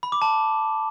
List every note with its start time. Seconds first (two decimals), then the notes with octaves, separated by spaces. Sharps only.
0.03 B5
0.12 D6
0.22 A5